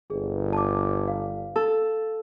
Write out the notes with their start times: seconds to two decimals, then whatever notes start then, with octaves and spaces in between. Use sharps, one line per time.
0.10 G1 G#4 B4
0.53 A5 D6
1.08 F5
1.56 A4